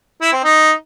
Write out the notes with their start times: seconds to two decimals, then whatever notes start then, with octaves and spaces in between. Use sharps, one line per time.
0.22 E4
0.33 C4
0.44 D#4